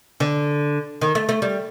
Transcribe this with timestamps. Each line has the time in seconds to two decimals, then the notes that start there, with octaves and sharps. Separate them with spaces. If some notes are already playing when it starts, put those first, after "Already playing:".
0.20 D3
1.02 D#3
1.15 A3
1.29 A3
1.42 G3